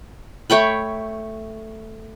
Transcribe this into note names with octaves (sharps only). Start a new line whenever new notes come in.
A3 C#5 G5 B5